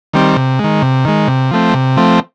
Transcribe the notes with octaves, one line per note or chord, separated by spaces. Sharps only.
D#3 G3 C4
C3
D#3 G#3
C3
D#3 G#3
C3
F3 A3 C4
C3
F3 A3 C4